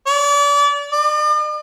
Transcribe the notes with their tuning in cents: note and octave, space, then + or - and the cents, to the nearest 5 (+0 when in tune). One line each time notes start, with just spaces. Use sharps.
D5 -35
D5 +45